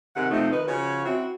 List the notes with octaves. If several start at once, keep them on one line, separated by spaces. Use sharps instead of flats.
G#2 C3 D#3 F#5
C3 F3 A3 D#4
D#3 D#4 B4
C#3 F3 F#4 C#5
C4 E4 F#4